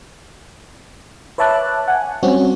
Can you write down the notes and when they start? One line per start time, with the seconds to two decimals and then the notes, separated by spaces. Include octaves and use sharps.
1.38 B4 C#5 E5 A5 D6 F#6
1.88 F#5 G#5
2.23 G3 C4 C#4 F#4 G4